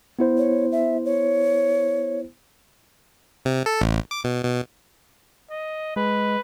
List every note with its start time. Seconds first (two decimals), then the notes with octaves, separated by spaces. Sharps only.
0.19 B3 E4 C5
0.38 C#5
0.72 E5
1.05 C#5
3.45 C3
3.66 A4
3.81 A1
4.11 D6
4.24 B2
4.43 B2
5.50 D#5
5.96 G#3 B4